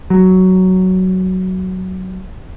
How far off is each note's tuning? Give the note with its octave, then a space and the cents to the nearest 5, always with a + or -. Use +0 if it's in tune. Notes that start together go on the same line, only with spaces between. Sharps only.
F#3 +10